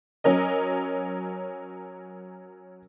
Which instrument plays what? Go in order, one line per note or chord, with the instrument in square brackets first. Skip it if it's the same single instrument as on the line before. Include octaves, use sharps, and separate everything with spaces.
[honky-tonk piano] F#3 C#4 A#4 D#5